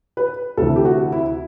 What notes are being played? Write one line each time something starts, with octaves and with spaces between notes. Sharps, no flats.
B4
D2 C3 E3 A4
G4
F#4
E4